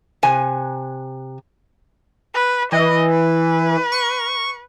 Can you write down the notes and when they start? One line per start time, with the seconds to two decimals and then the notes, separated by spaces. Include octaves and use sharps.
0.23 C3 G#5
2.34 B4
2.72 E3 D#5
3.10 B4
3.92 C#6